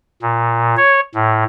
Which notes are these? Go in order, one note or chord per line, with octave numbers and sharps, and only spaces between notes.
A#2
C#5
A2